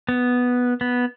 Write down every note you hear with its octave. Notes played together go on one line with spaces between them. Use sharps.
B3
B3